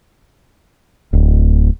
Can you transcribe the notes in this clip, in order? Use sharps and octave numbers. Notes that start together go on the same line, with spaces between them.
D1